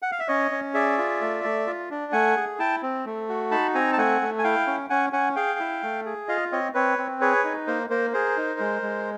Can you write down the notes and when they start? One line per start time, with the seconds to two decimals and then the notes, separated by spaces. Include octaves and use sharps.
0.02 F#5
0.12 F5
0.20 E5
0.28 C#4 C#5 D#5
0.51 C#4
0.74 G#4 D5 E5
0.98 F4
1.21 A3
1.44 A3
1.67 F4
1.91 D4
2.12 A3 F#5 G#5
2.37 G#4
2.59 E4 G5 A5
2.82 C4
3.06 A3
3.29 F#4
3.51 D#4 A5 B5
3.74 C4 G#5 A#5
3.93 A5
3.97 A3 F#5 G#5
4.21 A3
4.39 G#5
4.44 E4 F5 G5
4.67 C#4
4.90 C#4 F#5 G#5
5.13 C#4 F#5 G#5
5.36 G#4 F5 G5
5.59 E4
5.83 A3
6.06 G#4
6.28 F4 D#5 F5
6.52 C4 C#5 D#5
6.74 C4 B4 C#5
6.98 C4
7.21 G#4 B4 C#5
7.44 D#4
7.67 A#3 A#4 C5
7.90 A#3 A#4 C5
8.13 G#4 A#4 C5
8.37 D#4
8.60 G#3
8.82 G#3